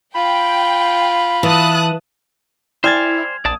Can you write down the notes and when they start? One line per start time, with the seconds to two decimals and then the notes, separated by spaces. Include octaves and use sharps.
0.15 F4 G5 B5
1.43 E3 A5 D#6 F#6
2.84 E4 C5 D5 G5 G#5 F6 G#6 A6
3.45 A#1 D5 A5 D#6